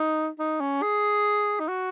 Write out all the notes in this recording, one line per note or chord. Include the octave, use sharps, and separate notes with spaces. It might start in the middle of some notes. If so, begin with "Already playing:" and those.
Already playing: D#4
D#4
C#4
G#4
D#4
F#4